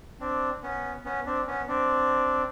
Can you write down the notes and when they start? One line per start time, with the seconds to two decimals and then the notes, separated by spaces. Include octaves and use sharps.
0.20 C4 D4
0.63 B3 C#4
1.05 B3 C#4
1.26 C4 D4
1.47 B3 C#4
1.68 C4 D4